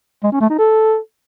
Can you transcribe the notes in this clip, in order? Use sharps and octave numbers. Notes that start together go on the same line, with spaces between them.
G#3
C#4
A3
D#4
A4